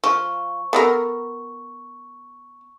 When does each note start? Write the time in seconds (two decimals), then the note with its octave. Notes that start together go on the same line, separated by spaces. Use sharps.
0.04 F3 C#6
0.73 B3 A4 A#4